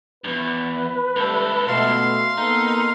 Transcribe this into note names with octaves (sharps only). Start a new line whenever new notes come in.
E2 G2 B4
C#2 G3 A3 A4
B2 A3 B3 E5 F5 C6
A#3 B3 D#4 A4